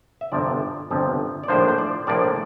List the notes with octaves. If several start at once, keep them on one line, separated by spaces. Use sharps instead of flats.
E5
G1 F2 C3 F3 D5
G1 F2 C3 F3
D5
A#1 A2 F3 A#3 D4 C5
C5
D5
A#1 A2 F3 A#3 D4 D5